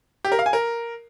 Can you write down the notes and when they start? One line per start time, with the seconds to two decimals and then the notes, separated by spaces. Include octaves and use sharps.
0.25 G4
0.32 A#4
0.39 F5
0.46 G#5
0.53 A#4